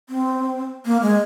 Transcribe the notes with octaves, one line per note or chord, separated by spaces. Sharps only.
C4
A#3
G#3